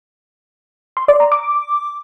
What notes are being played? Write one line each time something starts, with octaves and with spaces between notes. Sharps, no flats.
C6
D5
A#5
D6